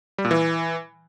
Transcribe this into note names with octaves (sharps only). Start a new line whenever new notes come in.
G3
A#2
E3